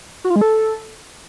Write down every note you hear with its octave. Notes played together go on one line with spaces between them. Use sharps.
F#4
F4
G#3
A4